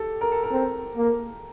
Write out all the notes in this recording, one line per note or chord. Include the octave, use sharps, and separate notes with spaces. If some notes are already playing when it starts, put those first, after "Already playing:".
Already playing: G4 A4
A#4
A4
A#4
C4
A#3